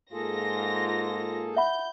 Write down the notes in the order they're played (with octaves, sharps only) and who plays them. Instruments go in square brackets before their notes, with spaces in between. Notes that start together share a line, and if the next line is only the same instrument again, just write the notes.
[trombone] G#2 [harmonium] A#3 G#4 A4 [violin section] F4 A#6
[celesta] E5 F#5 B5 [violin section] G6